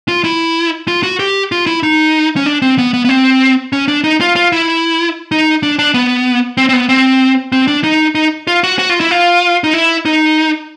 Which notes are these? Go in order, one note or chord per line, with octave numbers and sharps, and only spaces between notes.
F4
E4
F4
F#4
G4
F4
E4
D#4
C#4
D4
C4
B3
B3
B3
C4
C#4
D4
D#4
F4
F4
E4
D#4
D4
D4
B3
C4
C4
B3
C4
C4
D4
D#4
D#4
F4
F#4
F#4
F4
E4
F4
D#4
E4
D#4